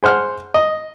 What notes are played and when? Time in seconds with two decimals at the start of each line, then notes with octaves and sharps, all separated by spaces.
0.03 G#4 C5 F#5 F6
0.54 D#5